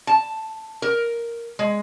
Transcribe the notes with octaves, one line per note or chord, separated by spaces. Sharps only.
A5
A#4
G#3